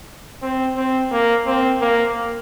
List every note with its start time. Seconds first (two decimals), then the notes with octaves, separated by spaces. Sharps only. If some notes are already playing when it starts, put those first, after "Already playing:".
0.42 C4
0.77 C4
1.12 A#3
1.47 C4
1.81 A#3